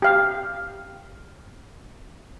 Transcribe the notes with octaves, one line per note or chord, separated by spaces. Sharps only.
G4 F5